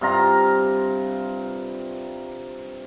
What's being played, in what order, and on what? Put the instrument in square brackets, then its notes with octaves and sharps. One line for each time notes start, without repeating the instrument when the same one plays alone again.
[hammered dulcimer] G2 C3 F4 A#5